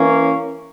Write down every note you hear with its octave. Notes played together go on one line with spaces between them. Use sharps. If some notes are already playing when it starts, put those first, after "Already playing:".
Already playing: E3 A#3 C#4